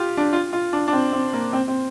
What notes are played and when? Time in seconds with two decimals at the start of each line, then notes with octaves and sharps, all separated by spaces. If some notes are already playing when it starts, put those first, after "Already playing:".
Already playing: F4 G4
0.17 D4
0.33 F4
0.53 F4
0.73 D4
0.88 D4
0.93 C4
1.13 C4
1.33 A#3
1.53 C4
1.68 C4